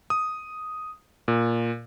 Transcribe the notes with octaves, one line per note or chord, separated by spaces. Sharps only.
D#6
A#2